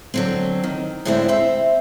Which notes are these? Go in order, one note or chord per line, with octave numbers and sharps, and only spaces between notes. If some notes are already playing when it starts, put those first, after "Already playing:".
D3 F#3 C4
D#3
A2 D3 G#3 C4 D4 E4
C4 C5 E5